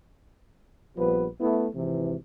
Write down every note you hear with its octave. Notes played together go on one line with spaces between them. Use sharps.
A#1 F3 G3 B3 B4
A3 B3 E4
G#1 C3 E3